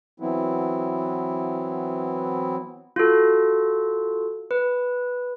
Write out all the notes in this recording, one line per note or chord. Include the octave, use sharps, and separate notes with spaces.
E3 F#3 B3 C4 E4
F4 F#4 A4
B4